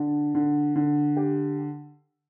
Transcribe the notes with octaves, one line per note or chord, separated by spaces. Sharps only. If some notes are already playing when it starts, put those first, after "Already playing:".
Already playing: D3 D4
D3
D3
G4